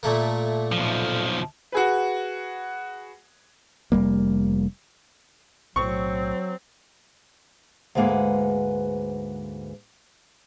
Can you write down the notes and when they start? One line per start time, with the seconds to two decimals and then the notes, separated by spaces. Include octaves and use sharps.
0.03 A#2 A3 A#3
0.72 B1 F3
1.72 F#4 G#4 B4
3.92 F1 E2 G3 A#3
5.76 B1 A2 F#3 C4 C#6
7.95 D2 G#2 G#3 A#3 B4 F#5